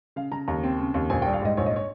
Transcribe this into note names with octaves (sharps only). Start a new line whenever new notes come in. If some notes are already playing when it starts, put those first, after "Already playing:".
C#3 F5
C#3 A#5
D#2 A#5
C4
C#3
D#2
A#1 G#5
G5
G3
F5
G#2 D#5
A#1 C#5
D#5
C#5